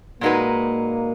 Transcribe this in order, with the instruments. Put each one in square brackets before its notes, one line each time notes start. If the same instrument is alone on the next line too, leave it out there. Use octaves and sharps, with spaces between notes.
[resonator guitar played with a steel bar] A#2 G#3 D#4 F#4 B4 [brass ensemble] A#3